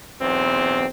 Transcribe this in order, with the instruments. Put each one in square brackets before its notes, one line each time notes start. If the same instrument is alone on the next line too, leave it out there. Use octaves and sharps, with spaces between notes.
[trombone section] B1 E2 C4